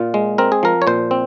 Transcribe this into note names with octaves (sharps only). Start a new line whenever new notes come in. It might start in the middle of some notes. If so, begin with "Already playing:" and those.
Already playing: A#2 F4
G#3
C4 A#4
G#4
F3 A#4
C#5
A#2 C5
C4